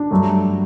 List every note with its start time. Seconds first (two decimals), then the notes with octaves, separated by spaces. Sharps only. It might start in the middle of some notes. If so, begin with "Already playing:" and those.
Already playing: D4
0.11 G2 F#3 A3